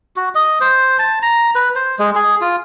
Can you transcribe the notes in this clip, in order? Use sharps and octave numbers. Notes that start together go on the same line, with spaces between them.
F#4
D#5
C5
A5
A#5
B4
C5
G#3
G#4
F4